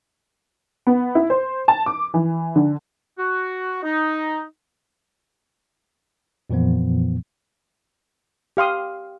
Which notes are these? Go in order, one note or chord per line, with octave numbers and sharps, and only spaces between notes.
B3
E4
C5
A5
D6
E3
D3
F#4
D#4
F2 A#2 E3 F3 B3
G4 F5 C6 D#6